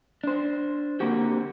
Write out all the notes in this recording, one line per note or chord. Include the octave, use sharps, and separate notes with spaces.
D4 C5
D3 A#3 C4 F#4 G4